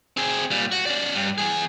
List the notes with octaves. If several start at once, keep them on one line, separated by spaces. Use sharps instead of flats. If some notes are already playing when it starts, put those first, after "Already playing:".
C4 G#4
A#2 G3
F#4
C#4 D5
G2
E2 G#4